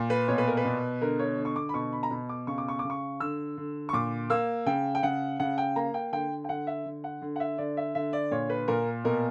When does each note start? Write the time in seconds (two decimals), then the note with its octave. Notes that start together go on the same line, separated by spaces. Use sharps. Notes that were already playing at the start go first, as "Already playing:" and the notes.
Already playing: A#2
0.10 B4
0.28 B2 C#5
0.38 B4
0.47 A#4
0.57 B4
0.65 B2
1.01 D3 A#4
1.19 C#5
1.38 D3
1.45 C#6
1.56 D6
1.69 B5
1.74 B2 C#6
1.93 B5
2.03 A#5
2.11 B2 B5
2.29 D6
2.47 C#3 C#6
2.58 D6
2.68 C#6
2.79 C#3 D6
2.90 C#6
3.20 D3 E6
3.57 D3
3.89 C#6
3.93 A#2 D6
4.30 A#3 E6
4.66 C#3 G5
4.95 G5
5.03 C#3 F#5
5.40 C#3 F#5
5.58 G5
5.76 A#3 A#5
5.94 G5
6.13 D3 G5
6.44 G5
6.49 D3 F#5
6.67 E5
6.85 D3
7.04 F#5
7.22 D3
7.36 F#5
7.40 E5
7.58 D3 D5
7.77 E5
7.95 D3 E5
8.13 D5
8.31 A#2 C#5
8.50 B4
8.68 A#2 A#4
9.05 B2 A#4